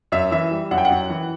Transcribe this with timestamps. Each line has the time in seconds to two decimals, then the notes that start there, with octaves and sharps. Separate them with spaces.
0.12 F#2 E5
0.31 E3 E5
0.51 G3
0.71 F#2 F#5
0.78 G5
0.85 F#5
0.90 F#2
1.10 E3